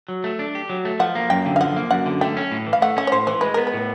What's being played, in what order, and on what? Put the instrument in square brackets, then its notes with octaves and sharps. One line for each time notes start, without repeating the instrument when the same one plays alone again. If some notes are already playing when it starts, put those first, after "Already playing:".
[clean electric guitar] F#3
A3
D4
G4
F#3
A3
[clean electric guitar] F3 [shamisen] F#5
[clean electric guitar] A#3
[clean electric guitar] F#2 [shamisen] G5
[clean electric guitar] D3
[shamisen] F5
[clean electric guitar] F3 [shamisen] F#5
[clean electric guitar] A#3
[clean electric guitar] F#2 [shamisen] F#5
[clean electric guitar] D3
[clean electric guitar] A3 [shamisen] G5
[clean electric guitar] C#4
A2
E3
[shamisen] F5
[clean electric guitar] A3 [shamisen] F#5
[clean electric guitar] C#4 [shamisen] F#5
[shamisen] C#5
[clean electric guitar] A2 [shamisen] C5
[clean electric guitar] E3 [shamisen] C5
[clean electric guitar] G#3 [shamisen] B4
[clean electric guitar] B3 [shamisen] A#4
[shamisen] B4
[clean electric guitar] A2